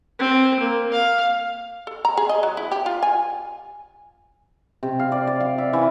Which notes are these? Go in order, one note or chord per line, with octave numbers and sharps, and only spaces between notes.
C4
A#3
F5
A4
A#5
G#4
D#5
F#3
E4
G4
F4
G#5
C3
F5
D5
D5
F5
E5
E3